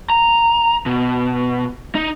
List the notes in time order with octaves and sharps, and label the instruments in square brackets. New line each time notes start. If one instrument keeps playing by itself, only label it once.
[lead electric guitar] A#5
B2
D#4